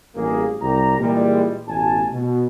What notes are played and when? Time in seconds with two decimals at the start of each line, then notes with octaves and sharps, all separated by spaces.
0.16 A1 G2 A#3 G#4
0.61 C2 G4 A#5
0.99 A#2 E3 G3 G#3
1.68 A1 B2 G#5 A5
2.12 B2